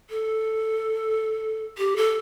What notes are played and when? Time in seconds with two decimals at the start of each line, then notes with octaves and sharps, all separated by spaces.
0.10 A4
1.78 G4
1.96 A4